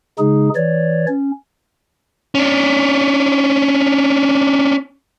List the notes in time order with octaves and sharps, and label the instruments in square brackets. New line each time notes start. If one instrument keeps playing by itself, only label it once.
[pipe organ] C#3 G#3 D#4 G#4
E3 C#5 D5
C#4
[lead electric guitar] C#4 D4